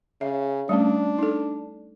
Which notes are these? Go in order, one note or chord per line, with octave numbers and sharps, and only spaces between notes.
C#3 E5
G3 A3 C#4 D4
D#4 A4